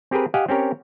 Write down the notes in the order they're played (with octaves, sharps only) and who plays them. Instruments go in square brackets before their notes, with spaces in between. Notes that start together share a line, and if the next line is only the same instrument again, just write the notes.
[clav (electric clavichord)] C4 G4 G#4 A#4 B4
G4 D#5 F5 F#5 G#5
C4 C#4 G4 A#4 C#5